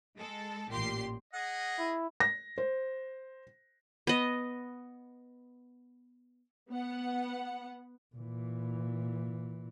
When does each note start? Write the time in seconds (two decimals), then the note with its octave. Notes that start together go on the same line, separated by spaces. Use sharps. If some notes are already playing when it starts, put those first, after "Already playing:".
0.17 G#3 A4
0.70 A1 A#2 G4 C6 C7
1.34 G#4 D#5 F#5
1.79 E4
2.20 A#6
2.58 C5
4.07 B3 D#5
6.70 B3 F#5
8.15 A#2 E3